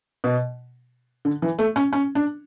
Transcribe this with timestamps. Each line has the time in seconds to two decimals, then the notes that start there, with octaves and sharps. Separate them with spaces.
0.24 B2
1.25 D3
1.42 E3
1.59 A3
1.76 C#4
1.93 C#4
2.15 D4